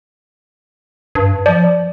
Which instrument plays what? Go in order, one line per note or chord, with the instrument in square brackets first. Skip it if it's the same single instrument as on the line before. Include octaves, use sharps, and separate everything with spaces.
[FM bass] G2
[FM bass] F3 [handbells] D5